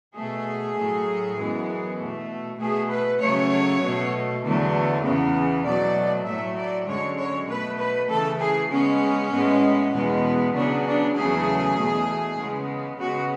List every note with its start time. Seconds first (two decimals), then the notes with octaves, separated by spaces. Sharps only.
0.15 B2 A3 G#4
0.77 A2 F#3 A3
1.37 F#2 E3 G#3 B3
1.98 A3
2.04 B2
2.60 B2 A3 G#4
2.90 B4
3.20 C#3 F#3 A3 C#5
3.82 B2 A3
4.43 E2 D3 F#3 A3
5.04 E2 C#3 E3 B3
5.65 B2 F#3 A3 D5
6.26 A2 F#3 A3 E5
6.57 D5
6.88 F#2 D3 G#3 C#5
7.18 C#5
7.48 B2 A3 B4
7.80 B4
8.10 C#3 E3 A3 A4
8.40 G#4
8.71 C#3 G#3 B3 C#4
9.32 A2 G#3 B3
9.93 E2 B2 G#3 B3
10.54 C#3 F#3 B3 D4
10.86 D4
11.16 E2 C#3 F#3 A3 G#4
11.77 E2 B2 A3
12.38 C#3 G#3 B3
12.99 C#3 G#3 B3 F#4